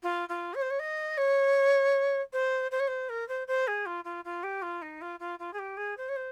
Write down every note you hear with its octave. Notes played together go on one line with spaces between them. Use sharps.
F4
F4
C#5
C5
C#5
D#5
C#5
C5
C5
C#5
C5
A#4
C5
C5
G#4
F4
F4
F4
G4
F4
D#4
F4
F4
F4
G#4
G4
G#4
C5
C#5
C5